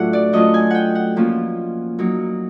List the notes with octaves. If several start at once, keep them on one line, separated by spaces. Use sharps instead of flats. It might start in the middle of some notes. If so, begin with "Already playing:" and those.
Already playing: A2 F#3 A3 D4 F4 E5 F#5
D5
F#3 A3 C#4 F4 D#5
G#5
F#5 G5
F#5
F3 A#3 C#4 F4
F#3 A#3 D#4